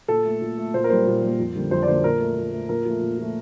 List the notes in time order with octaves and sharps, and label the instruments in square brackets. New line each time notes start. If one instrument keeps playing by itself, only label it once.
[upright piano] A#2 A4
A3
A#2
A3
A#2 C5
A#4
G3 A#3 C5
A#2
G3 A#3
F2
D3 G3 A#3
F2 C5
D5
D3 G3 A#3 C5
A#2 A#4
A3
A#2
A3
A#2 A#4
F3 A3
A#2
F3 A3